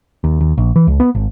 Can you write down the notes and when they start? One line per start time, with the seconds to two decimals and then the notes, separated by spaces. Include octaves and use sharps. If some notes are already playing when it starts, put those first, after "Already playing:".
0.24 D#2
0.41 D#2
0.58 A#1
0.76 E3
0.87 C#2
1.00 B3
1.15 G#1